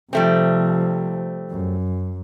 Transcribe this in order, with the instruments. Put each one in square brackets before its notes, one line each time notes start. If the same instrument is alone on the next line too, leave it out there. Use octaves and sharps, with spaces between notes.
[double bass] C3 F3 [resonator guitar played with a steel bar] G3 A3 C4
[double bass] F#2